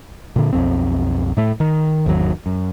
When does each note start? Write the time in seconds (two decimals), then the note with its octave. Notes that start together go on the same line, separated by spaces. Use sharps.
0.36 A#2 D3
0.53 B1 F2 C4
1.37 A2 A3
1.60 D#3
2.06 G#1 E2 D#3 F#3
2.46 F#2